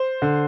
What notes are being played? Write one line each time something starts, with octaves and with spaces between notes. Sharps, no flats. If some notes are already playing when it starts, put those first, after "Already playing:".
Already playing: C5
D3